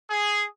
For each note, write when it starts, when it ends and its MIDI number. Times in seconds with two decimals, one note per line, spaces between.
0.10 0.45 68